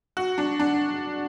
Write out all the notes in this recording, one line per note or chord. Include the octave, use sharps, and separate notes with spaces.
F#4
D4
D4